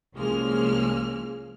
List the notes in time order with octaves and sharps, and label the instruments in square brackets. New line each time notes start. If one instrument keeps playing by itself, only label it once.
[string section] C2 F3 G#3 A#3 C#4 F6